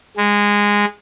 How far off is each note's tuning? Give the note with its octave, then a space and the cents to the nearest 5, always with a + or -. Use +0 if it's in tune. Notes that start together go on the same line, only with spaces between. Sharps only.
G#3 -15